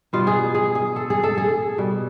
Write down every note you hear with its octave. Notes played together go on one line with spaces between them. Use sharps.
B2 G3 F4
G#4
G#4
G#4
A4
G#4
A4
G#4
B2 G3